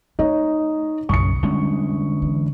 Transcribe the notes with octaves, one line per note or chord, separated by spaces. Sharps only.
A3 D#4 C#5 D#5
D1 B1 F#2 C#3 C#6 D#6 C#7
D3 G3 G#3 C#4
E3